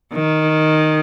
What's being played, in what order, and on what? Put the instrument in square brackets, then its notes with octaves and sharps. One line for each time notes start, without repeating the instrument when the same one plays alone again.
[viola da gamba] D#3